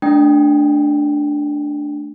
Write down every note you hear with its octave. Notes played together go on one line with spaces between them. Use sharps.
A3 D4 G5